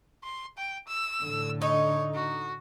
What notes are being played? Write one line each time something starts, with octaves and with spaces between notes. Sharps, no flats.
C6
G5
E6
A2 D3
D#4 C#5
F#4